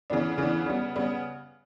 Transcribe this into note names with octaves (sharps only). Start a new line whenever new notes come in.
C#3 E3 B3 D4
C#3 E3 B3 D4
C#3 G3 B3
C#3 G3 B3